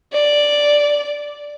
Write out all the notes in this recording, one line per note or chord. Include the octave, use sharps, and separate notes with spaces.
D5